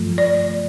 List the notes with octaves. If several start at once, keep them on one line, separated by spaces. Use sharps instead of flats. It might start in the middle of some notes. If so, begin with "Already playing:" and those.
Already playing: G2 F3 A3
D5